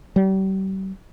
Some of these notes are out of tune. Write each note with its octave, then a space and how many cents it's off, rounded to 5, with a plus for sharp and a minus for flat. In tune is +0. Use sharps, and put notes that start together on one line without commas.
G3 -40